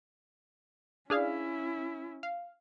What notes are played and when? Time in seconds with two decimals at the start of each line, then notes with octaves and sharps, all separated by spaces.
1.10 C#4 D4 E4 G#4 F5
2.23 F5